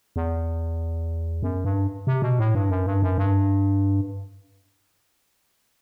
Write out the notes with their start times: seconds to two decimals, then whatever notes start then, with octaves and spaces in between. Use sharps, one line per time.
0.16 E2
1.43 F#2
1.65 G2
2.07 C3
2.22 B2
2.39 A2
2.55 G2
2.70 F#2
2.86 G2
3.02 F#2
3.18 G2